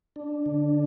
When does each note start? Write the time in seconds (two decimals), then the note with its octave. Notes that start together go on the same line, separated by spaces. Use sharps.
0.16 D4
0.46 D3